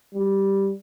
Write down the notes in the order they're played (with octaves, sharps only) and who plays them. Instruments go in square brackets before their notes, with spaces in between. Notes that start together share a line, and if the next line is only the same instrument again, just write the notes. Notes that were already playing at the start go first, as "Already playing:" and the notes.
[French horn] G3